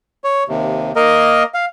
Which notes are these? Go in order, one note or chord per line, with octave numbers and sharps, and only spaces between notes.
C#5
D#2 C3
A#3 A#4 D#5
F5